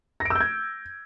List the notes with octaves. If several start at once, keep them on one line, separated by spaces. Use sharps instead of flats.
A#6
D7
E6
G6
G#6